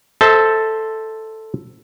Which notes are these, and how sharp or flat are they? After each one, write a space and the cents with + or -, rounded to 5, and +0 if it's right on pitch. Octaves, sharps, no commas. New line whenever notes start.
A4 +0 C5 +0 E5 -35